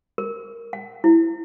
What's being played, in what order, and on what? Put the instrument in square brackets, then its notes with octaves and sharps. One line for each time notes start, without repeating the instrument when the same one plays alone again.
[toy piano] A#4
F#5
E4